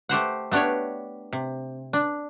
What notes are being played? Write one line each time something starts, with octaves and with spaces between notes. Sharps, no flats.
A3 G4 C5 F#5
A3 B3 D4 G4 C#5
C3
D4